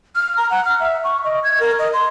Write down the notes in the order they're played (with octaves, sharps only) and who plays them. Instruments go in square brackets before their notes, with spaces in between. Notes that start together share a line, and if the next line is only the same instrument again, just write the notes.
[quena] F6
A#5
F#5
F6
E5
C#6
D#5
G#6
A#4
D#5
C6